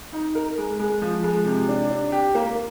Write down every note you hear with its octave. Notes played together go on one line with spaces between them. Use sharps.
D#4
A#4
G#3
G#3
F3
G#3
C3
D4
D4
G4
A#3